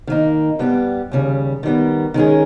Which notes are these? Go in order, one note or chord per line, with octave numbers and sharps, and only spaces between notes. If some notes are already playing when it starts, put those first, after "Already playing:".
D#3 A#3 D#4
G2 G3 B3 G4
D#2 C#3 G3
D#3 G3 B3
D#3 G#3 C#4 G#4